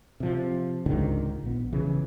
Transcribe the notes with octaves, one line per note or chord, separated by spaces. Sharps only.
C3 F3
C#2 G#2 D3 D#3
A#1 B3
C#3 E3